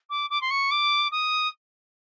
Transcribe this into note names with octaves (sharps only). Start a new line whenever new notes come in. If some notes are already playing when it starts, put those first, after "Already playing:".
D6
D6
C6
C#6
D6
D#6